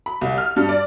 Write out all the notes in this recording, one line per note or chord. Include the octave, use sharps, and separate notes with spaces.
B5
C2
F6
G2
D5